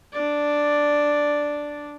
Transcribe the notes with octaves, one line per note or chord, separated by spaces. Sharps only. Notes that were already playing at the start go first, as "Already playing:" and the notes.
D4 D5